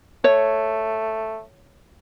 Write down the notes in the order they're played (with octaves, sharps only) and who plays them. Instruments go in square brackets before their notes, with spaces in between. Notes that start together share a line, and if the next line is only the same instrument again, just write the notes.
[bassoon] A3 [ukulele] C#5